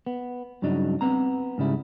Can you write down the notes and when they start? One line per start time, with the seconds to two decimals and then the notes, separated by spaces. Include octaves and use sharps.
0.06 B3
0.62 G2 C#3 F#3 D4 D#4
1.01 B3 C4 A#5
1.58 G#2 C#3 G3 E4